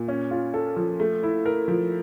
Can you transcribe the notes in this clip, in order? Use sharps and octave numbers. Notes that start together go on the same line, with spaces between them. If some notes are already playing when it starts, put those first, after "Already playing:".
Already playing: A#2
C#4
F4
A4
F3
A3
E4
A#4
F3